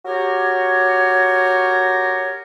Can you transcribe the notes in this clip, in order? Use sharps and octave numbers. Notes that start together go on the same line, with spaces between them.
F#4 G4 A#4 C#5